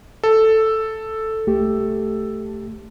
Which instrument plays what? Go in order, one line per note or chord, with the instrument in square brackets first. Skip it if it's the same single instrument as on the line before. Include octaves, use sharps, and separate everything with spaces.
[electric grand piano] A4
[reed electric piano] C2 A3 G4